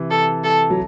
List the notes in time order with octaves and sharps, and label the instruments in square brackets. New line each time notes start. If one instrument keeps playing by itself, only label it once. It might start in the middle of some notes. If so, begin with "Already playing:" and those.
Already playing: [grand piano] C3 E3
[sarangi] A4
A4
[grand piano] F#3